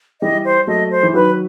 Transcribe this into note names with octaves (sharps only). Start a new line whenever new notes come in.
E3 G3 D#5
C5
F#3 A3 D#5
C5
E3
D#3 F#3 B4